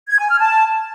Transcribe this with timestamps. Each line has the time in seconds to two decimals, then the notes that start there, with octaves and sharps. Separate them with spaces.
0.08 G#6
0.19 G#5
0.29 F6
0.39 A5